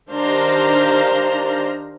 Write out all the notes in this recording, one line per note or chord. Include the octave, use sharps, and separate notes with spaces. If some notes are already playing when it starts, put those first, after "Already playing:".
D#3 D4 G4 C5 F5 A#5